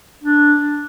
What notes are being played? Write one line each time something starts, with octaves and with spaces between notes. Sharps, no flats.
D4